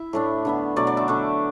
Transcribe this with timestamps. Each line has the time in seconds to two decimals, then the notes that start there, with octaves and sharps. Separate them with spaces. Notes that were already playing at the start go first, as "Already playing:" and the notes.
Already playing: E4 E5
0.13 A2 A3 D4
0.45 D3 B3 E4
0.76 B2 F#3 A3 D5
0.87 D5
0.97 E5
1.08 D3 A3 D4 D5